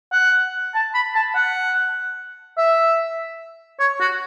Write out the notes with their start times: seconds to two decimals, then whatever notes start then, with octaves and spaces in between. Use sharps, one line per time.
0.13 F#5
0.74 A5
0.94 B5
1.15 A5
1.35 F#5
2.57 E5
3.80 C#5
4.00 F#4